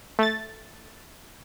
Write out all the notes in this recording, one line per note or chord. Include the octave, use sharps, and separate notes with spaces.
A3 A6